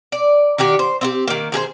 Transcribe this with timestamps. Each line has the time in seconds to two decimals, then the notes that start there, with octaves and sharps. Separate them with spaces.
0.12 D5
0.58 D#3 F#4 G4 D5
0.79 C5
1.01 C4 F4 G4
1.28 D#3 A#3
1.52 D#3 G#4 A4 C5